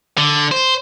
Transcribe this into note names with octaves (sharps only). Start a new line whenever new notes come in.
D3
C5